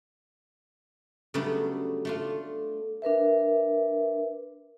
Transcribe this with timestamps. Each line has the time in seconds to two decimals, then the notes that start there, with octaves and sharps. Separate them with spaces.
1.34 C#3 F#3 G3 A3 B3 D4
2.05 A3 D4 F4
3.02 D4 A#4 B4 E5